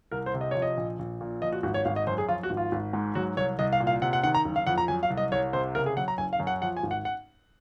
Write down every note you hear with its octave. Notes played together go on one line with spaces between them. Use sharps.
C2 A#4
C5
C3
D#5
F3 C#5
D#5
A#1
A#1
A#2
F3 D#5
F#4
G#1 F#4
C#5
G#1 F5
D#5
F#2 C5
G#4
F3 F4
F#4
G#1
F4
G#1
G#2
F#3 F#4
C2 C#5
C2 D#5
F5
A#2
F5
C3 F#5
F#5
D#3 F#5
A#5
F#1
F5
F2 F#5
A#5
F#3 G#5
F5
C2
D#5
C2 C#5
C3 C5
C#3 A#4
G#4
F#3 F#5
A#5
F#1 G#5
F5
F#2
F#5
F3 F#5
G#5
G#1
F#5
F#5